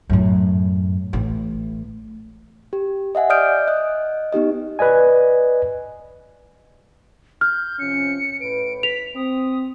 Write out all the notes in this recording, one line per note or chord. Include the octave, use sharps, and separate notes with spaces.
F#2 A2
A1 A2
G4
D#5 E5 F#5 G#5
D5 D#5 D#6 F6 G6 D7
D#5 F#6
B3 D#4 G4 D#5
B4 D5 D#5 G#5
F6 G6
C3 F3 C#4 C#7
A2 B4 D7
B6 F7
C4 D#6